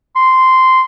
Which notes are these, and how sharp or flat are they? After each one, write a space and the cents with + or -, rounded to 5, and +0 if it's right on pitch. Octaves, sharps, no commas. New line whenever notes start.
C6 -10